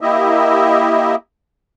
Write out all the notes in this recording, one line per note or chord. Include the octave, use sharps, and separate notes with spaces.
A#3 E4 G4 D#5 E5